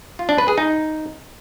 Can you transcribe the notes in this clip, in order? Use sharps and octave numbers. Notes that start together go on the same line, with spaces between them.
F4
D4
B4
G#4
D#4